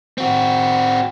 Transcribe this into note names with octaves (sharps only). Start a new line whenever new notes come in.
C4 F#4